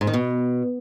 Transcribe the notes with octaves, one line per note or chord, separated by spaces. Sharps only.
G#2
D#3
B2